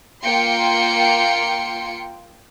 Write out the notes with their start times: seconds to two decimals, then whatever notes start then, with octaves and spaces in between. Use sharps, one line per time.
0.23 A#3 F4 G5 C6 C#7